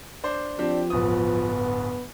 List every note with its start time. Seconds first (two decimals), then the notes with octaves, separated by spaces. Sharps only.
0.24 D4 C5
0.59 F3 C4 D4 G4
0.90 D1 G1 B3 D#6